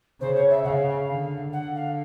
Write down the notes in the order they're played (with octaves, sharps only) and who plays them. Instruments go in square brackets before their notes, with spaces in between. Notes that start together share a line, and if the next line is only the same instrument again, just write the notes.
[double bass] C#3 [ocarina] C5
[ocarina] C#5
E5
[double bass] C#3 [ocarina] F5 F#5
[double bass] D3
[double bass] D3 [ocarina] F#5
[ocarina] F5